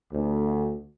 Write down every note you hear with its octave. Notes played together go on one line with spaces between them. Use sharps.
D2